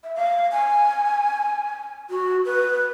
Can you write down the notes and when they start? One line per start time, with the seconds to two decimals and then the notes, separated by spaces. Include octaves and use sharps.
0.04 E5
0.15 F5
0.52 G#5
2.10 F#4
2.45 B4